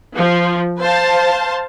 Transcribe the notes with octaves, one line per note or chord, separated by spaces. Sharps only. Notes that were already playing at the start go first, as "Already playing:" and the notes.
F3
C5 F5 A5